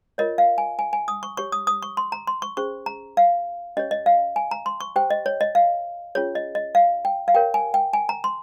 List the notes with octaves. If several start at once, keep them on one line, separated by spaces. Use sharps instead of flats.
F4 A#4 C#5 D#5
F5
G#5
G#5
G#5
D#6
C#6
G4 C#5 C#6
D#6
D#6
C#6
C6
A#5
C6
C#6
C#4 G#4 C5 C#6
A#5
F5
C#4 G4 C#5 D#5
D#5
F5
G#5
A#5
C6
C#6
G4 C5 G5
D#5
C#5
D#5
F5
C#4 F4 G#4 C#5
D#5
D#5
F5
G5
F5
G4 A#4 C#5 G5
G#5
G5
G#5
A#5
C6